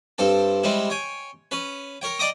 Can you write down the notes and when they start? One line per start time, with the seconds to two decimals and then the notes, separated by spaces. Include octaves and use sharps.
0.18 G2 C4 A4
0.63 G3 G#3 C4 E4
0.90 C#5 G5 G#5
1.51 C#4 B4
2.02 A#4 C#5 G5
2.19 D5 D#5 G5 A#5 D6 D#6